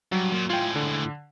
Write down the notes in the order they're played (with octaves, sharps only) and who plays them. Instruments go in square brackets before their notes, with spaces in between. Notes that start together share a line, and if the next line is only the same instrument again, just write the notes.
[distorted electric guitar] G2 [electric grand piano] F#3
[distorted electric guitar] A#2
[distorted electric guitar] A2 G#3 [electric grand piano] F4 G5
[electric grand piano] D3